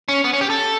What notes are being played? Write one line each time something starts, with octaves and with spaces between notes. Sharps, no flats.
C#4
B3
C#4
G4
A4